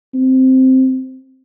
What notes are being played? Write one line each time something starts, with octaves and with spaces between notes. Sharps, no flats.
C4